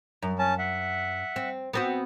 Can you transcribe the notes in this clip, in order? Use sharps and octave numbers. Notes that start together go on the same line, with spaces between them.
F#2
C#4 A5
E5 F#5
C4
B3 C4 F#4